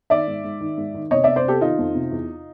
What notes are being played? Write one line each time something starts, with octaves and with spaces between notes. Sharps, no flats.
D#3 D5 E5
G#2
G#2
D#3
G#2
D#3
C3 C#5 D#5
C3 D5 E5
C5 D5
C3 G4 A4
D#3 D#4 F4
F2
C3
E2